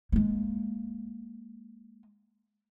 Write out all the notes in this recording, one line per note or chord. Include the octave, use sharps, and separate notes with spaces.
G#3 A#3